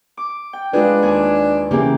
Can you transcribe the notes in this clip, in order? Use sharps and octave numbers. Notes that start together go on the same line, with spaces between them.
D6
G5
G#3 D4 F4 G#4 B4
D#2 G#4 G#5
C#3 E3 A#3 G4 G#4